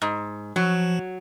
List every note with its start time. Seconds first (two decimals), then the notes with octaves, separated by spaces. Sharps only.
0.02 G#2
0.56 F3 F#3